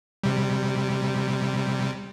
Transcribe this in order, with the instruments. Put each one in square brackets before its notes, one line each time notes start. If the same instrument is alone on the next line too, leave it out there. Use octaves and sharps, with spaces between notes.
[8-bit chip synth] C3 G3